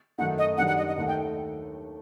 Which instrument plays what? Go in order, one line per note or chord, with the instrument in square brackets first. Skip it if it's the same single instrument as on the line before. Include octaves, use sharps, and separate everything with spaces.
[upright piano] F#2 D#3 A3 D#4 [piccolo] F#5
[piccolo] D#5
[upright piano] F#2 D#3 G3 D4 [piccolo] F#5
[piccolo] F#5
D#5
D#5
[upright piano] D#2 D#3 A3 [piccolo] F#5
[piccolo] G5